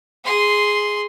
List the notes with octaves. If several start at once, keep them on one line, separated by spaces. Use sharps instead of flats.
G#4 C6